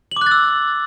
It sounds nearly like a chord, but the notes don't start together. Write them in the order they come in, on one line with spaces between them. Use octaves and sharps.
F#7 D6 F#6 A6 E6